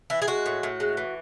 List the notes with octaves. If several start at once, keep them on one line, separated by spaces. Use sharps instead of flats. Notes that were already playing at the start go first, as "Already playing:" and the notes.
E3 E4
G#4
G#3 F#4
A2
A2
G#3
E3